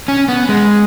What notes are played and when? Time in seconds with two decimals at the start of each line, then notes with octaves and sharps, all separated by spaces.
0.08 C#4
0.28 B3
0.49 G#3